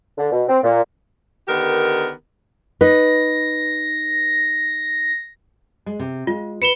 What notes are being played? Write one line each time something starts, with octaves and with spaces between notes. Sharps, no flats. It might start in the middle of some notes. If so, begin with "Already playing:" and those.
D3
B2
C4
A#2
D3 D#3 B3 G4 A#4
D#4 B4 A#6
G#3
C3
G#3 F4
B4 C#7 E7 G7